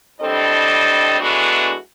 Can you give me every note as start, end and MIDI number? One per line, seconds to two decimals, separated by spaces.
0.21 1.19 45
0.21 1.19 55
0.21 1.19 60
0.21 1.19 62
0.21 1.19 69
0.21 1.19 75
1.19 1.75 52
1.19 1.75 56
1.19 1.75 57
1.19 1.75 59
1.19 1.75 62
1.19 1.75 66